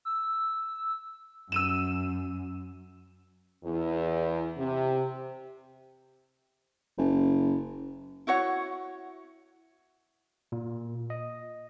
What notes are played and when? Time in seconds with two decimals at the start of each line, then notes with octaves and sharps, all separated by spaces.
0.05 E6
1.52 F#2 E6 D#7 E7
3.64 E2
4.57 C3
6.98 F#1
8.27 E4 F#4 C#5 F#5
10.52 A#2
11.10 D#5